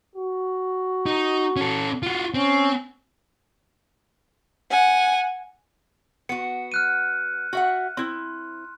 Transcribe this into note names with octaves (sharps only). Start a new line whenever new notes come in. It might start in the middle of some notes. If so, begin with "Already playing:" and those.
F#4
D#4
C#4 A4
F4 F#4
C4 C#4
F#5 G#5
B3 F#4 C#7
F6 F#6 D#7
F#4 E5 F#5
C4 E4 C6